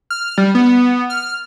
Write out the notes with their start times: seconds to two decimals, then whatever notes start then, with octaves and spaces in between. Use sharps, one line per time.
0.10 F6
0.38 G3
0.55 B3
1.10 F6